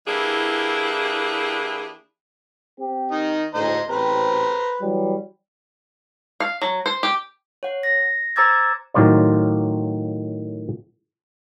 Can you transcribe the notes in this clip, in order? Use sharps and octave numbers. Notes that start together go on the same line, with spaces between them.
E3 A#3 D4 E4 G4 G#4
C4 G4
D#3 D#4
A1 D2 C5 D#5 A#5
A1 C4 G4 B4 C5 A#5
E3 F#3 G3
F5
F#3
C5
G4
C#5 F#5
A#6
C5 A#5 D6 E6 G#6 A6
A2 D#3 F#3 F4 C5 D5